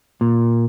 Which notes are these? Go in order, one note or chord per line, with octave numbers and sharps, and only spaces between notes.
A#2